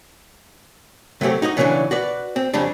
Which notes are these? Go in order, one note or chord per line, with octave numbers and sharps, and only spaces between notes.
C3 F#3 A3 C4 G4
D#4 F#4 C5 D#5
C#3 E3 F#3 A#3 C#4 D4
F#4 B4 D5
C4
F2 C#3 G3 D4